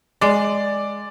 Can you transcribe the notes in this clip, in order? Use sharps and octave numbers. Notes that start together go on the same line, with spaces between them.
G#3 D5